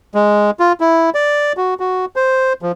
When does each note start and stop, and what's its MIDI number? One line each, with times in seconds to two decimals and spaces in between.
0.15 0.51 56
0.60 0.73 65
0.80 1.10 64
1.14 1.53 74
1.57 1.74 66
1.80 2.05 66
2.16 2.53 72
2.62 2.72 53